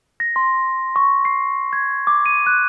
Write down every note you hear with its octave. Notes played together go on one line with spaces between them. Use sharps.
A#6
C6
C#6
C7
G#6
D6
D#7
F#6